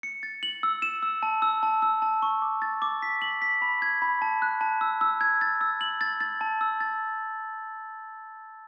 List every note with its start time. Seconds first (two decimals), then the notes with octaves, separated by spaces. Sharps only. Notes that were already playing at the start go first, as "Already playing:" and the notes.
0.03 C#7
0.23 A6
0.43 F#7
0.63 E6
0.82 E7
1.03 E6
1.23 A5
1.42 E6
1.63 A5
1.82 E6
2.02 A5
2.22 C#6
2.42 D6
2.62 A6
2.82 D6
3.02 B6
3.22 F#7
3.42 B6
3.62 B5
3.82 G#6
4.02 B5
4.22 A5
4.42 F#6
4.61 A5
4.81 E6
5.01 E6
5.21 G#6
5.41 A6
5.61 E6
5.81 F#7
6.01 A6
6.20 A6
6.41 A5
6.61 E6
6.81 A6